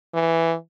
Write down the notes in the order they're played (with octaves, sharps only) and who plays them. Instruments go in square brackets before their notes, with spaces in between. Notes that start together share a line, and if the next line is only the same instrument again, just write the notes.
[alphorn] E3